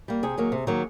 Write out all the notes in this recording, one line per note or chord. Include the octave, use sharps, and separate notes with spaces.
G3 A#3
C3 G#4
D#3 F#3 A#3
C3
D#3 F#3 A#3